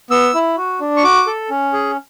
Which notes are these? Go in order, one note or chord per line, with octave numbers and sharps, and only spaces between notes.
B3 E6
E4
F#4
D4
C#6
F#4 D6
A4
C#4
G#4